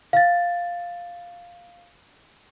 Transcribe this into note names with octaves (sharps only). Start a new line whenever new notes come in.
F5 A6